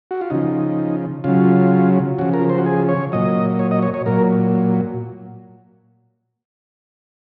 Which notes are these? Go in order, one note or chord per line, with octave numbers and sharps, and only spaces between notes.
F#4
F4
C#3 F3 D#4
C#3 F#3 F4
C#3 F3 F#4
A#4
C5
F#4
G#4
C#5
A#2 F#3 D#5
C#5
D#5
C#5
C#5
A#2 F#3 A#4